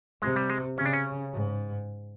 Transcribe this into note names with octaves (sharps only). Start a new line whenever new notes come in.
C3 G#3
G3
G#3
C#3 C#4
D4
C#4
G#2